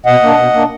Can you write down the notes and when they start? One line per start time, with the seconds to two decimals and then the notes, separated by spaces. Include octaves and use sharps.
0.06 B2 D#5 F#5
0.22 A#3 D4
0.38 B2
0.53 A#3 D4